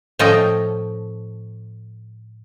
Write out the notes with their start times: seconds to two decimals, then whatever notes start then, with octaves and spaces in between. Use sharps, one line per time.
0.19 A2 F3 C#4 A4 D#5 G5